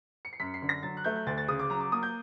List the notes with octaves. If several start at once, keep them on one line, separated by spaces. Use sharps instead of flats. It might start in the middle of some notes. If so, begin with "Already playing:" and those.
C#7
C7
F#2 B6
C7
D3
A#6
F#3 A6
F#6
A3 G6
G6
D2 A6
A6
C#3 D#6
D6
F#3 A#5
D6
A#3 D#6
G6